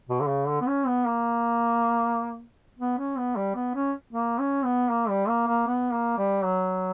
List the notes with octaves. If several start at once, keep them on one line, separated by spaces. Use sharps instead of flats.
B2
D3
C#3
D3
B3
C#4
B3
A#3
B3
C#4
B3
G3
B3
C#4
A#3
C#4
B3
A#3
G3
A#3
A#3
B3
A#3
G3
F#3